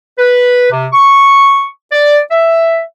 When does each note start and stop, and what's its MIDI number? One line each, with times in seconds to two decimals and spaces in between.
0.18 0.70 71
0.71 0.87 48
0.93 1.66 85
1.92 2.19 74
2.31 2.82 76